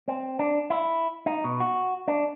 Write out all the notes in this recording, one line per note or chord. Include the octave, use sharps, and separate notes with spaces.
C4
D4
E4
D#4
B2
F#4
D4